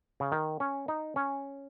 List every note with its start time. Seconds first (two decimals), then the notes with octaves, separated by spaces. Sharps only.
0.20 C#3
0.32 D#3
0.60 C#4
0.88 D#4
1.16 C#4